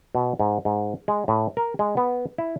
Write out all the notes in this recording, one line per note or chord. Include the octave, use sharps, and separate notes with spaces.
B2
G#2
G#2
G#3
A2
A#4
G#3
B3
E4